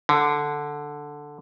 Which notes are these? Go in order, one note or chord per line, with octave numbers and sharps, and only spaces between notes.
D3